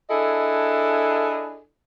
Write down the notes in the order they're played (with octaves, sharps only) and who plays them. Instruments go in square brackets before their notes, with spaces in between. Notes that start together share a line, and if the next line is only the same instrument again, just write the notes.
[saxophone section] D4 E4 G#4 A4 D#5